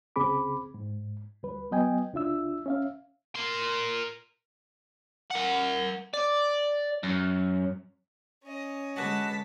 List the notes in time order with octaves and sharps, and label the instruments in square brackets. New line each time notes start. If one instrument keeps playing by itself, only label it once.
[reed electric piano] C#2 C#3 C4 G#4 B5 D6
G#2
D2 G3 B4
F#3 B3 D#5 G5 G#5
C#2 D4 F4 E5 E6
C#4 E5 F5
[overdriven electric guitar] A#4 C6
A#4 F#5
D5
F#2
[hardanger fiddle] C#4 D#5
[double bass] D3 G#3 [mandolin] F#4 B4 [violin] A5 B6